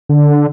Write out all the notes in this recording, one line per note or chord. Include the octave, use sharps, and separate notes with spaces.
D3